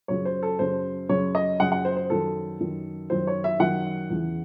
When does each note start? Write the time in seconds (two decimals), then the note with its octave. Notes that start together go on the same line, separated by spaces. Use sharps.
0.08 F#2 C#3 F#3 C#5
0.25 C5
0.43 A4
0.59 F#2 C#3 F#3 C5
1.09 F#2 C#3 F#3 C#5
1.35 D#5
1.60 F#2 C#3 F#3 F#5
1.72 F#5
1.85 C5
1.97 C5
2.10 F#2 D#3 F#3 A4
2.60 F#2 D#3 F#3
3.10 F#2 D#3 F#3 C5
3.27 C#5
3.44 E5
3.60 F#2 D#3 F#3 F#5
4.10 E2 C#3 E3